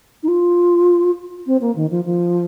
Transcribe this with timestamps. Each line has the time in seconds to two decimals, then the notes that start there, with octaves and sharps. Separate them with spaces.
0.23 D#4
0.28 F4
1.47 C4
1.61 A#3
1.76 D#3
1.91 F3
2.05 F3